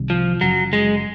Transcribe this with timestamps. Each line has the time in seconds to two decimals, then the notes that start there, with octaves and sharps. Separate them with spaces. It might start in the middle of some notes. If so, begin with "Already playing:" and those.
Already playing: C2 C3 D#3 G3
0.10 F3
0.41 F#1 F#2 C#3 F#3
0.73 G#3